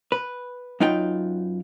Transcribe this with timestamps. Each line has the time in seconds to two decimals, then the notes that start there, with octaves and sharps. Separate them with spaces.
0.12 B4
0.80 F#2 F#3 D#4 F4 B4 G5